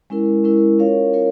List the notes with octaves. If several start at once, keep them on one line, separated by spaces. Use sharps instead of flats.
G#3 C#4 E4 A#4
G#3 C#4 E4 A#4
C#4 F4 A#4 C#5 F5
C#4 F4 A#4 C#5 F5